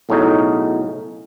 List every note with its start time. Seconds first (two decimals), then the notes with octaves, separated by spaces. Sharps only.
0.09 B1 A2 C#3 C#4 D#4